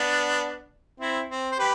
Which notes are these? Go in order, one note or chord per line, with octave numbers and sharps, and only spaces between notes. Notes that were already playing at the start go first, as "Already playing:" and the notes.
Already playing: B3 D4
C4 E4
C4
C5
G4 B4